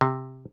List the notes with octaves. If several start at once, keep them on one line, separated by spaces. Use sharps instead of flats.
C3